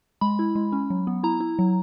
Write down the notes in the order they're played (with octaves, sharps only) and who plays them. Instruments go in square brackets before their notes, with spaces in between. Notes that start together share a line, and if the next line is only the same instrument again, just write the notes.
[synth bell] G#3 B5
E4
G#3
C#4
F#3
B3
E4 A#5
E4
F#3